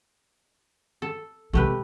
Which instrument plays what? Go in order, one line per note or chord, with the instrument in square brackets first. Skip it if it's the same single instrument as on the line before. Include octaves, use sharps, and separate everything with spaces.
[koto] A4
[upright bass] C3 G#3 [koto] A3 G4 B4